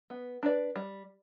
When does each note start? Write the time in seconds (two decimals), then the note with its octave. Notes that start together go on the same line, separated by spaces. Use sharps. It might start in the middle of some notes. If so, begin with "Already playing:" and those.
0.10 B3
0.43 D4 B4 D5
0.76 G3